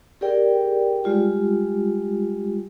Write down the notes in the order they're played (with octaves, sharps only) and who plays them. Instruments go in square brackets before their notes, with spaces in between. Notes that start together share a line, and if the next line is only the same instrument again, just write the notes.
[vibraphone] G4 G#4 A#4 D5 G5
G3 G#3 F4 G4